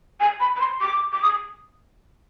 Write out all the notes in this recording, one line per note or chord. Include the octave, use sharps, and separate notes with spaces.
G#5
B5
B5
C6
D6
D6
D#6